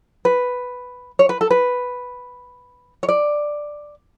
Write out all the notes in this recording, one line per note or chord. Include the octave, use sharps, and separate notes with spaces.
B4
C#5
B4
A4
B4
C#5
D5